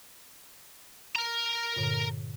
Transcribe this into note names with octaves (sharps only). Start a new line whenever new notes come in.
A#4 A#5
G2 A#2 D3